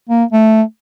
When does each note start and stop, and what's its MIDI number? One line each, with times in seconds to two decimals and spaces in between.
0.09 0.24 58
0.32 0.62 57